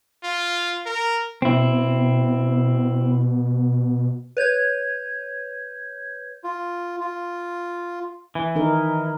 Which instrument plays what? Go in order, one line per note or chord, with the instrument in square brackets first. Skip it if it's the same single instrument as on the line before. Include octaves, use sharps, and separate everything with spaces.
[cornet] F4
A#4
[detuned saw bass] B2 [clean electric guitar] C4 E4
[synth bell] B4 C#5 G6 G#6
[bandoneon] F4
F4
[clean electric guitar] E3
[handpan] D#3 D#4 A#4